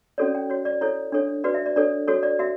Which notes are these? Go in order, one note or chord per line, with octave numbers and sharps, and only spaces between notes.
C#4 F#4 A4 C#5 D5
G5
F#4 C#5
D5
E4 A4 C#5
D4 A4 C#5
F#4 B4 D5
E5
D5
D4 A4 C#5 D5
F#4 A4 C#5
D5
F#4 E5